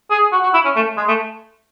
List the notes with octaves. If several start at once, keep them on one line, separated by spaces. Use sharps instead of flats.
G#4
F#4
F#4
E4
C#4
A3
G#3
A3